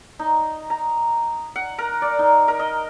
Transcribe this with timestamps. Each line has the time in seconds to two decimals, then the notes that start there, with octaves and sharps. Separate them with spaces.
0.19 D#4
0.70 A#5
1.56 F#5
1.78 A#4
2.02 D5
2.19 D#4
2.48 A#4
2.59 D#5